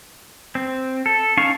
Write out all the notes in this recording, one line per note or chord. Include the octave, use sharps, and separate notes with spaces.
C4
A4
C#4 D#4 F5 A5 C#6